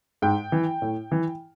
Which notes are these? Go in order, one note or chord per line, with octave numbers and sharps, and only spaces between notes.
G#2 G5
E3
A2
E3